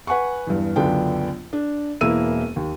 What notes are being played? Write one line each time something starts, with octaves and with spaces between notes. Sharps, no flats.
B4 F#5 G#5 C#6
E2 G2
C#2 F#2 D3 B3 D4 G5
D4
E1 E2 A#3 E4 E6 D#7
D#2